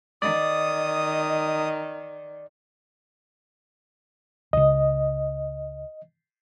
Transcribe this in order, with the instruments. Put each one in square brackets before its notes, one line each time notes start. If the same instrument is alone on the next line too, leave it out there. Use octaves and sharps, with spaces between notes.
[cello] D#3 [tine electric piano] D5 [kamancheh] D#5 [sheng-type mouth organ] D#6
[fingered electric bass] C#2 C#3 [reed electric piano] D#5